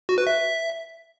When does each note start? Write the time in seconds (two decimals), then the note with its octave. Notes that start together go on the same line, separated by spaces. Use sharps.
0.09 F#4
0.18 B4
0.27 E5